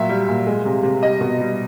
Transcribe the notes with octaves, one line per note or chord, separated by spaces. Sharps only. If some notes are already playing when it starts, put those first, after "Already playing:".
Already playing: A#2 F#3 E5
G3
A#2
G#3
C3
C3
G3 D#5
B2
G3